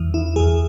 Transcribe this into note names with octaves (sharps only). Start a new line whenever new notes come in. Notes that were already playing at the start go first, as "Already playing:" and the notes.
Already playing: E2 E3
E4
E2 E3 G#4